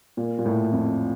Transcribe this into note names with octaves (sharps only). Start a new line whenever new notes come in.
A#2
A#2
A2
F2